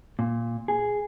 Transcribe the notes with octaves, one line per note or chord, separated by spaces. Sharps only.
A#2
G#4